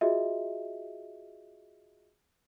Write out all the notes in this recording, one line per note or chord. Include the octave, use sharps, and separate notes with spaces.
F4 F#4 G#4 D#5 E5